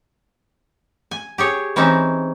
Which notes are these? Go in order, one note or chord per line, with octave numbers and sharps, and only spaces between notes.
G#5
G4 G#4 C#5
E3 C4 C#4 D#4